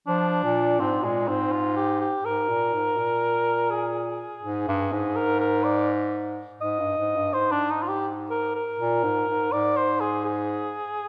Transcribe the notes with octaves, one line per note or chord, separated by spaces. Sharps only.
F3 D4
A#2
G#2 C4
A#2 G#3
G#2 C4
F4
G4
G4
G#2 A#4
A#2
G#2
A#2
G#4
G#2
G2
G#2
A#4
A#4
D5
G#2 D#5
G2
G#2
G2
G#2 C5
D4
D#4
F4
G4
A#4
A#4
A#2
G#2
G#2
G#2 D5
C5
G#4
G#4